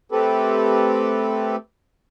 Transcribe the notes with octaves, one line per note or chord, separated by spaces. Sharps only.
A3 C4 G4 A4 B4